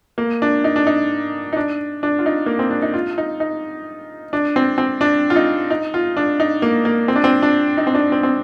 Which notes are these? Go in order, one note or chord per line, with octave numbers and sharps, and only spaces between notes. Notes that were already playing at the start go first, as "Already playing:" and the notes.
A#3
D4
D#4
D4
D#4
D#4
D4
D4
F4
D#4
A#3
C4
D4
D#4
F4
D#4
D#4
D4
C4
C4
D4
F4
D#4
D#4
F4
D4
D#4
A#3
A#3
C4
D4
C4
D4
D#4
C4
D4
C4
C4